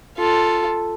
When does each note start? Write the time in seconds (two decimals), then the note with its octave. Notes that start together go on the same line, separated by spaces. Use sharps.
0.18 F4 A4